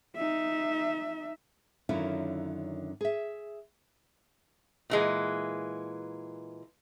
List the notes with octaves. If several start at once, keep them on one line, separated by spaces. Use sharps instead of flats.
D#4 E5
F#2 D3 D#3 C#4 E4 F4
G#4 E5
A#2 E3 G#3